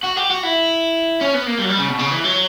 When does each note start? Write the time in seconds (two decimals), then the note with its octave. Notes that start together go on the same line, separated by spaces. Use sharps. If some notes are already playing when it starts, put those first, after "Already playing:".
0.04 F#4
0.17 G4
0.31 F#4
0.44 E4
1.21 C#4
1.34 B3
1.47 A#3
1.60 G3
1.65 F#3
1.70 G3
1.80 C#3
1.90 B2
1.99 C#3
2.11 E3
2.25 F#3